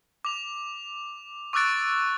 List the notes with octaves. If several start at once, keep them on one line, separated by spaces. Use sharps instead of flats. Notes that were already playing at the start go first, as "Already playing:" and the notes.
D6 F7
C#6 D6 E6 F#6 A6 D7